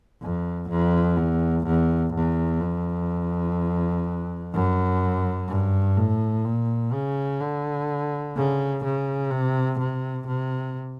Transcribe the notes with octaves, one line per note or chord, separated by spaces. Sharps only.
F2
F2
E2
E2
E2
F2
F#2
G2
A2
A#2
C#3
D3
C#3
C#3
C3
C3
C3